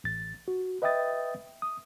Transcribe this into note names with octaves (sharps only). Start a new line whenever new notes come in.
A1 A6
F#4
B4 D#5 E5 G5 D#6 A6
D#6